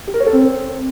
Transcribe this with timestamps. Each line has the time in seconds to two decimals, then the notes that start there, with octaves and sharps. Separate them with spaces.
0.08 G4
0.14 A#4
0.20 C#5
0.26 A4
0.33 C4